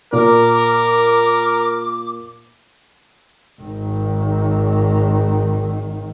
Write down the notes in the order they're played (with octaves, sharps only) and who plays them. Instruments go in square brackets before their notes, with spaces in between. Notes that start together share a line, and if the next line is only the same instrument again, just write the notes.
[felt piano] A#2 [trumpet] A#4 [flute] D6
[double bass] G#1 D#3